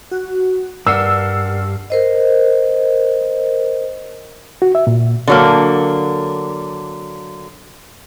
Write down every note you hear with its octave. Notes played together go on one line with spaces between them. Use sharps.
F#4
G2 A#4 D5 F#5 E6 F6 C7
A#4 C5 D#5
F#4
E5
A#2
D3 F#3 A#3